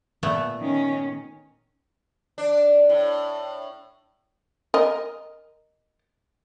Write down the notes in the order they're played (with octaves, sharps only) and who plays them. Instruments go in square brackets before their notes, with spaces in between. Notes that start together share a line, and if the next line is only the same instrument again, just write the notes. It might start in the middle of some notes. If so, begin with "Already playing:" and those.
[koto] A#2 A3 B3
[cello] D#3 C#4
[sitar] D4
A2
[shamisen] A#4 D#5